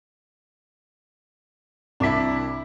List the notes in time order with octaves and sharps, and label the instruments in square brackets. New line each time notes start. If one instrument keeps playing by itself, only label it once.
[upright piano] C2 D6 B6 [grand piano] D4 E4